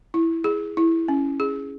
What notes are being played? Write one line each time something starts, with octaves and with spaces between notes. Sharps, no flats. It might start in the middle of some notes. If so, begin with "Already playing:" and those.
E4
G#4
E4
C#4
G#4